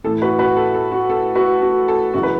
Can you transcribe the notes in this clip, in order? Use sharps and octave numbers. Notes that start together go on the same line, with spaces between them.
A2 E3 A4
F#4 B4
F#4 B4
A4
A4
F#4
A4
F#4 B4
F#4
A4
F#2 C#3 E3 F#4
B4